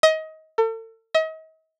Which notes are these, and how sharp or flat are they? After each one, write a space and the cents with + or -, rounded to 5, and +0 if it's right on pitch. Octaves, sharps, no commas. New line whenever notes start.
D#5 +25
A4 +40
D#5 +40